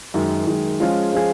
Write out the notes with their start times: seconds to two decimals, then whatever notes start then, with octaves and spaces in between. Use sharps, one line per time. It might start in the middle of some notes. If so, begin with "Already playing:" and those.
0.14 F#2 D#3 G#3
0.47 F#2 D#3 G#3
0.80 F3 G#3 C#4 F4 G#4
1.13 F3 G#3 C#4 F4 G#4